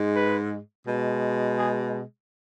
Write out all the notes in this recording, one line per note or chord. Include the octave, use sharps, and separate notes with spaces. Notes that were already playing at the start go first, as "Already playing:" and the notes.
Already playing: G#2 G#3
B4
B2 G#3
G#4